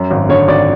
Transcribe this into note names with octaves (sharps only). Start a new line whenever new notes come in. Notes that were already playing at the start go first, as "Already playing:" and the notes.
Already playing: F#2
G#1
D3 C#5
C#5
G#1 D5